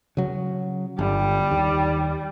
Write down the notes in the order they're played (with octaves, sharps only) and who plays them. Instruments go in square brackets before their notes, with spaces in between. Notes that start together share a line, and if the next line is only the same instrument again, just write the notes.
[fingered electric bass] C#3 F#3
[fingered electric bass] G1 [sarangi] G3
[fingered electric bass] D#2